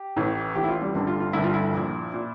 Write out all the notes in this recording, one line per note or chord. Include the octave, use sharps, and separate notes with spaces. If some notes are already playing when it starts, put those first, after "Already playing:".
Already playing: G4
A1 A2 E3
A1 A2 E3 G4
E4
F4
G3
G1 G2 D3
F4
F4
G1 G2 D3 E4
F4
E4
A#1 A#2
A#2